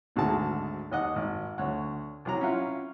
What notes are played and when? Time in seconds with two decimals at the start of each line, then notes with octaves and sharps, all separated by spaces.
0.16 G#1 D2 G#2 F#4 G#4 A5
0.91 D#2 D#5 F#5
1.16 G#1
1.58 D2 C#5 F#5
2.25 C2 F#3 A#5
2.41 C#4 E4 F4 F#5